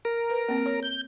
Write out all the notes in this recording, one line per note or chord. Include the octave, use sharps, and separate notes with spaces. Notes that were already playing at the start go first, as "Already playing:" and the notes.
A#4
B4
A#3 C4
C#5
G6